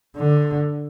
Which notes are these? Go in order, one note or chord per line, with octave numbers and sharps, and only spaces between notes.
D3